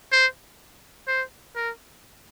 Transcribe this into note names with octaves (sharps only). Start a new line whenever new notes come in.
C5
C5
A#4